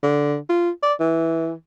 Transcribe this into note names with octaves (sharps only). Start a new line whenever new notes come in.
D3
F4
D5
E3